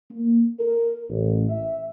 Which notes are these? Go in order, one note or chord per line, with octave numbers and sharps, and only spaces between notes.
A#3
A#4
A1
E5